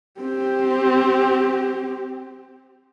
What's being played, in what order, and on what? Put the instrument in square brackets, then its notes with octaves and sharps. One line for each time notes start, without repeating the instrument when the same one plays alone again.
[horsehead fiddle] C4 G4